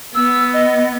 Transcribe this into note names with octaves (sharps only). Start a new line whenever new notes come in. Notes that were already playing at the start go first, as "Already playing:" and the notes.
B3 E6
D#5